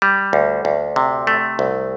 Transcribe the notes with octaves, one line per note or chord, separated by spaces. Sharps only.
G3
D2
D2
C3
A3
C2